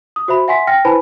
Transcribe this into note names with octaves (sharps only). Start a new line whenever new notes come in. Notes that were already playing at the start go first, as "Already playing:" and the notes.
D#6
F#4 C5 E5 B5
E5 F#5 G#5 C6 B6
G5 F6 A#6
E4 B4 C5 G#5 A5 B5